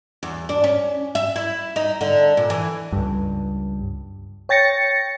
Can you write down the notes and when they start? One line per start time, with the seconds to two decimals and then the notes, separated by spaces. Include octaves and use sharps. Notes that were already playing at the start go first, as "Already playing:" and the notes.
0.23 E2
0.49 D4
0.64 C#4
1.15 E5
1.36 E4
1.76 D#4
2.01 D3
2.37 A#2
2.50 E3
2.92 C#2 G2
4.49 C#5 G5 A6 A#6 C#7